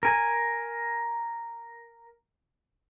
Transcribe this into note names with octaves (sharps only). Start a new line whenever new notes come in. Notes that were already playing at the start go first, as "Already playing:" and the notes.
A#4 G#5